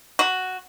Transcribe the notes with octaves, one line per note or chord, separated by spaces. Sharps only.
F#4